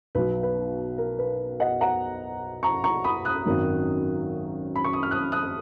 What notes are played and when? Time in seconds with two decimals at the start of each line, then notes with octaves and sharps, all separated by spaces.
0.15 B1 B2 F#3 B4
0.43 B4
0.98 A#4
1.19 B4
1.60 D#5 F#5
1.81 F#5 A#5
2.63 A#5 C#6
2.84 A#5 C#6
3.04 B5 D#6
3.25 D#6 F#6
3.46 G#1 F#2 D#3 F#3
4.76 B5
4.84 C#6
4.93 D#6
5.03 F6
5.11 D#6 F#6
5.32 D#6 F#6